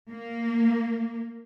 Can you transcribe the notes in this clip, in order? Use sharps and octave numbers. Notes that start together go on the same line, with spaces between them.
A#3